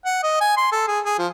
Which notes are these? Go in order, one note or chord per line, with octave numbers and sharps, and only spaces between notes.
F#5
D#5
G#5
C6
A4
G#4
G#4
F3